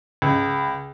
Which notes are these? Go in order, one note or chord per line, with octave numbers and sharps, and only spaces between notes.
C#2